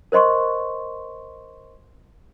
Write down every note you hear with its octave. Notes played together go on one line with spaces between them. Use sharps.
A#4 C5 D#5 C6 C#6